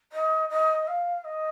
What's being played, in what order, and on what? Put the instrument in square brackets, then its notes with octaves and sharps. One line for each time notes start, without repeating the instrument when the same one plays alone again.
[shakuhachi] D#5
D#5
F5
D#5